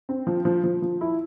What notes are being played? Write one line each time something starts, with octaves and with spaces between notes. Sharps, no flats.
C4
F3
F3
F3
F3
E4